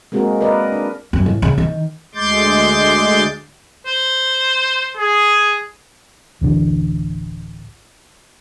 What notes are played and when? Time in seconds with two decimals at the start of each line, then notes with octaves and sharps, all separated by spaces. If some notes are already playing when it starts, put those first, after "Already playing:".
0.12 G#3 A#3 C4 F#4 G#4 A#4
0.41 A#4 B4 D5 D#5
0.72 D4
1.13 F#2
1.26 A1
1.42 C#3
1.58 D#3
2.15 D2 G#3 C6 D6 G6 A6
3.86 C5
4.97 G#4
6.41 D1 A1 D3